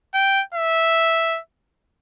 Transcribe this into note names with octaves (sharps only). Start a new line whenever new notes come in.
G5
E5